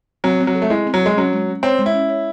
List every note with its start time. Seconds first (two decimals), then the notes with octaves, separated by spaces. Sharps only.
0.24 F#3 C4
0.40 C4
0.47 F#3
0.55 A4
0.62 A3
0.70 G#3 E4
0.87 C4
0.94 F#3
1.02 G#3 A4
1.17 F#3 C#4
1.33 G#3
1.47 C#4
1.63 C4 C#5
1.79 G#3
1.86 E4
1.94 C#4
2.09 C#5